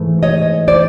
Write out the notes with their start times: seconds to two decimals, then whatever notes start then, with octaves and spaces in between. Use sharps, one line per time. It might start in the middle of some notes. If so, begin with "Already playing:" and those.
Already playing: G#2 E3 A3
0.23 C#5 D#5
0.68 C5 D5